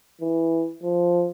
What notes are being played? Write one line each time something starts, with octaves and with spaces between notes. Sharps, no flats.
E3
F3